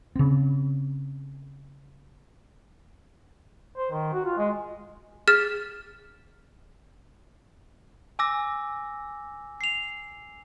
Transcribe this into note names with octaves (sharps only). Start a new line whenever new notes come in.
C#3 C4
C5
D#3
F#4
F4
G#3
G#4 F6 A6 B6
G#5 D6 E6 A#6
C7 F7